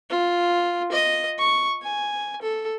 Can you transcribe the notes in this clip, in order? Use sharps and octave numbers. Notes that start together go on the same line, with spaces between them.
F4
D#5
C#6
G#5
A4